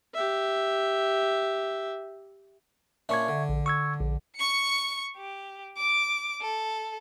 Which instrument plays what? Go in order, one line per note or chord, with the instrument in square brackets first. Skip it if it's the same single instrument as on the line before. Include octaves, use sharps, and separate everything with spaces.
[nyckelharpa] G4 E5
[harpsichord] A#2 C#4 D4 [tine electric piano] E5 C#6 G#6
[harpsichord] D3
[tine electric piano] A#1
C#6 E6 G#6
A#1
[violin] C#6 C#7
G4
D6
A4